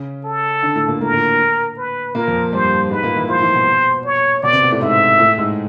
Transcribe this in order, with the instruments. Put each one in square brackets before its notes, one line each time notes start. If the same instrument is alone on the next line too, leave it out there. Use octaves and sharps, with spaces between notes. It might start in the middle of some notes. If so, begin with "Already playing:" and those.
Already playing: [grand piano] C#3 C#4
[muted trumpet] A4
[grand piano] D3 D4
A2 A3
A#2 A#3
[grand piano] A2 A3 [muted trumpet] A#4
[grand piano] A#2 A#3
[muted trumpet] B4
[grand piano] A#2 A#3 [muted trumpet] A#4
[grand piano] F2 F3
[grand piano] G2 G3 [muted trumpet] C5
[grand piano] G#2 G#3 [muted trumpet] B4
[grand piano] A#2 A#3
E3 E4
[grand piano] F3 F4 [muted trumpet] C5
[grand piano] E3 E4
B2 B3
[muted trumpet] C#5
[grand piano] B2 B3 [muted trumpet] D5
[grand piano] C3 C4
B2 B3
A2 A3
[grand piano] G#2 G#3 [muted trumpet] E5
[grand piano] A2 A3
G#2 G#3